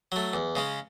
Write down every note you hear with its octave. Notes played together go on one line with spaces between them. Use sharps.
F#3 A3
E2
C#3 G#3 C#4